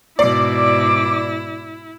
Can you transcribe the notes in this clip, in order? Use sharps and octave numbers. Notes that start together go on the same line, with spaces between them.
G#2 B2 E4 D5 D6